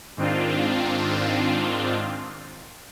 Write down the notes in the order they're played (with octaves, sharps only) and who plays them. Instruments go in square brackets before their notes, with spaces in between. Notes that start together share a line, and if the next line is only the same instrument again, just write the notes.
[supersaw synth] G#2 D#3 C4 D4 F4